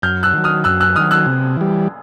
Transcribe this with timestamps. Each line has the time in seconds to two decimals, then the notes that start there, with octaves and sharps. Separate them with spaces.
0.02 F#2 F6 G6
0.23 E6 F#6
0.33 D#3 F#3
0.44 D#6 F6
0.64 F#2 E6 F#6
0.80 E6 F#6
0.96 D#3 F#3 D#6 F6
1.11 E6 F#6
1.26 C3
1.57 E3 G3